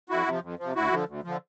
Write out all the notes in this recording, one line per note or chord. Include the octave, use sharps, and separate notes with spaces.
F2 E4 F#4
C3 F3
F2
C3 F3
D2 E4 F#4
D3 F3
D2
D3 F3